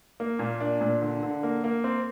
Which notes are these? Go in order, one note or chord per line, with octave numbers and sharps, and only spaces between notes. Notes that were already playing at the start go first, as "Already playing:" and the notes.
A#3
A#2
D4
A#2
D3
D3
A#3
A#3
C4